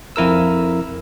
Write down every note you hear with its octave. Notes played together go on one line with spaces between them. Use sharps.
F2 E4 A#4 E6